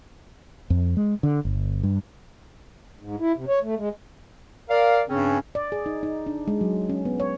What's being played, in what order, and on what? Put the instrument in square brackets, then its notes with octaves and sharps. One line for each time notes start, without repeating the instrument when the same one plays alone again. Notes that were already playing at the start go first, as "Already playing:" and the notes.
[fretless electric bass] F2
G#3
D3
G1
G2
[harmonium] G#2
E4
C3
C#5
A3
G#3
[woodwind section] A#4 D5 F5
G2 C#3 C4 C#4
[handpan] D5
G#4
D#4
D#4
D4
G#3
F#3
C#4
B3
C#5